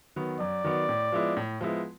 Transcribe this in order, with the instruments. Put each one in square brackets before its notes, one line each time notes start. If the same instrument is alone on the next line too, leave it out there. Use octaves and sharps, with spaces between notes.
[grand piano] D#3 F#3 B3
[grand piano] F#2 [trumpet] D5
[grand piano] D#3 F#3 B3
A2
F3 G#3 B3 E4
A2
F3 G#3 B3 E4